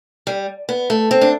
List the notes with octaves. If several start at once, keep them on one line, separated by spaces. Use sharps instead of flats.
G3
B3
A3
C4
D4